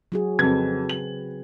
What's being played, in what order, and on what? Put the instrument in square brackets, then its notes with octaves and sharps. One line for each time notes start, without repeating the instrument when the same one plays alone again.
[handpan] F#3 F#4 G#4
[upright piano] F2 G#6 [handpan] C#3 C4 B4
[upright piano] F#7